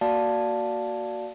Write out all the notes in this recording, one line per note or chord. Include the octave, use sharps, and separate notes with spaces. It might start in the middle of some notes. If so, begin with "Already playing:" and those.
A#3 F#4 D5 F5 A5